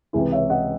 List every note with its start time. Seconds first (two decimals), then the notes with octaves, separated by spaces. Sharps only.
0.13 C#2 C3 E3 E4 G#4
0.32 C#5 E5
0.50 D#5 F#5